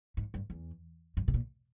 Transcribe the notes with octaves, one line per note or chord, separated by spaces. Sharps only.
G#2
G2
E2
G2
B2
A#2